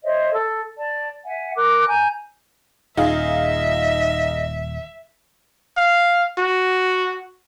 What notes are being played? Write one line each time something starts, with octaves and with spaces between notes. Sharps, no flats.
C5 C#5 D#5 E5
A4
D5 A5
E5 F#5 G#5
A#4 D6 F#6
G#5 A#5 G6
D#1 D#4 F4 G#4 D#5 E5
F5
F#4